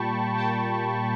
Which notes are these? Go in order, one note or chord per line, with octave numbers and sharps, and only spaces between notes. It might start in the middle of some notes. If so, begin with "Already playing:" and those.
Already playing: A#2 G3 A#3 G5 A5 B5 C#6
G5 A5